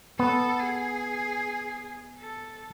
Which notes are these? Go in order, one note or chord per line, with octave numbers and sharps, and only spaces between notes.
B3 A4
G#4
A4